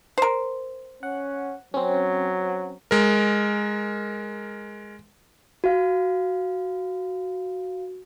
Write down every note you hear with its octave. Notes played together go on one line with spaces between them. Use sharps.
A#4 C5
C#4 F#5
F#3 C4 C#4
G#3 A#4
F#4 F5